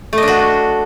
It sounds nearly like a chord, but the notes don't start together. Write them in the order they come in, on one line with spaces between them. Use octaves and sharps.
A3 D#5 D4 F#4